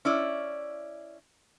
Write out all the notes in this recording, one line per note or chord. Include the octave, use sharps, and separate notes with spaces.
C#4 E4 D5